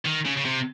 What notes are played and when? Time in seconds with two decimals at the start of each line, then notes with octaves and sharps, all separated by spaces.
0.06 D#3
0.25 C#3
0.37 C#3
0.45 C3